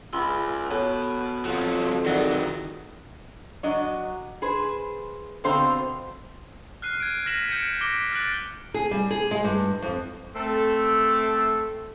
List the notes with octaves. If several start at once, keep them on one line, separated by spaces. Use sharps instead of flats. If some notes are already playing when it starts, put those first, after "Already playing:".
C#2 B5 C6 E6
B2 A4 C#5
F2 F3 F#3
D#3 E3 F#3 G#4 D5 F#5
F#3 D4 F#4 D#5
G#4 B4 C5
B2 D3 C4 C5 F5 A#5
F6 F#6 C7 D#7
G#6 D7
F6 A#6 B6 D#7 E7 F#7
F6 G6 G#6 C#7 D7
D6 A#6 B6 D7 G7
F6 F#6 A6 D7 F#7
G#4
G3
G#4
G#3
G2
F2
A3 C4 A4